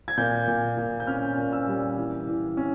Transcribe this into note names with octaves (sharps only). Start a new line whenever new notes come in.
G#6
A#2 G6
A#2
A#2
G6
C#4 F6
A#2
E6
G3
E3
E3
C#4